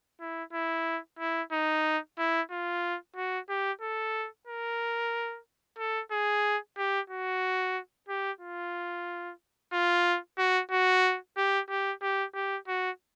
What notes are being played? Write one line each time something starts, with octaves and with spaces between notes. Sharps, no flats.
E4
E4
E4
D#4
E4
F4
F#4
G4
A4
A#4
A4
G#4
G4
F#4
G4
F4
F4
F#4
F#4
G4
G4
G4
G4
F#4